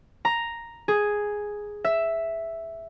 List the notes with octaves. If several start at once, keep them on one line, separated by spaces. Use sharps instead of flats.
A#5
G#4
E5